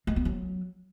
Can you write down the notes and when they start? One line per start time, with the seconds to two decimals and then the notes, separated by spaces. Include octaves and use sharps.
0.07 G#3
0.16 B3
0.25 F#3